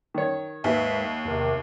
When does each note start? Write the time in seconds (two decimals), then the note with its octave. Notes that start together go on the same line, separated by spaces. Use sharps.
0.14 D#3 C#5
0.64 D#2 G#2 B4 E5
1.25 E2 C3 D#3